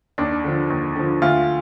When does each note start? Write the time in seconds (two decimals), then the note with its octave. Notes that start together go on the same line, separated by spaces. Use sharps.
0.18 D#2 D4
0.44 D3 F3
0.70 D#2
0.96 D3 F3
1.22 D2 F4